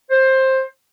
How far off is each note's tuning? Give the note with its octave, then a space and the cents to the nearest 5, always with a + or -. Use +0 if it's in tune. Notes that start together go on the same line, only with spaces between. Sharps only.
C5 +15